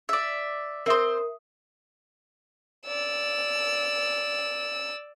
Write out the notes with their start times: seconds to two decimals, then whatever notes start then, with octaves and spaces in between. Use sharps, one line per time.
0.09 D5 E5
0.86 C4 A#4 C5 E5 D#6
2.87 D5 E6